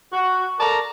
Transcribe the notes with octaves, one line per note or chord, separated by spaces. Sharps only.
F#4
A4 A#4 D5 A5 A#5